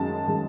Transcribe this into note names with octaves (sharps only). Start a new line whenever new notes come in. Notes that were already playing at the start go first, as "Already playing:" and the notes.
Already playing: F#2 D#3 G#3 A5
D#3 G#3